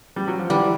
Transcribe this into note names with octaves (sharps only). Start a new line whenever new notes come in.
G3
F#3
F3
D3 E3 G3